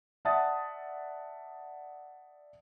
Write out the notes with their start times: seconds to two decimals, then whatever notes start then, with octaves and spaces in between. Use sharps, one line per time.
0.25 D5 E5 F#5 A5 D#6 A6